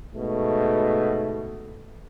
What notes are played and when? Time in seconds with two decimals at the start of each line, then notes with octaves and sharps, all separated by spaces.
0.14 G#2 B2 A3